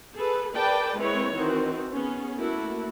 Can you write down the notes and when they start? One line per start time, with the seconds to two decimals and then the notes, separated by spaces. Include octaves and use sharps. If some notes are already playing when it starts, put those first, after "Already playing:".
0.16 G#4 A4 B4
0.52 G#4 A#4 B4 D5 G5 A5
0.97 G#3 A#3 C4 E4 B4 C#5
1.34 D#3 E3 C4 D#4 F#4
1.94 B3 C#4 G#4
2.37 A3 A#3 E4 F#4 A4